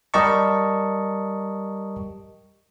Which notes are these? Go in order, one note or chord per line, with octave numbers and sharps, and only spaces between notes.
G3 G4 A#4 D#5 A5 C#6